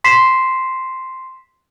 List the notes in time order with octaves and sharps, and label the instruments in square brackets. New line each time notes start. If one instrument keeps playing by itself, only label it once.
[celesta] C6 B6 C7 E7